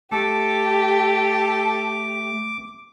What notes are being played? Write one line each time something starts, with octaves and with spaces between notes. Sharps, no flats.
A3 G4 A4 D6